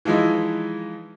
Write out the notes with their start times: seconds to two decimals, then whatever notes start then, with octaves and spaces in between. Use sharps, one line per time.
0.05 E3 F3 G#3 D#4 E4